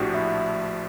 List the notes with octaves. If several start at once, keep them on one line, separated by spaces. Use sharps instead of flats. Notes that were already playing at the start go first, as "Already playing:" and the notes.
Already playing: A#1 A2 F3 A3 D4 F#4 G4
E4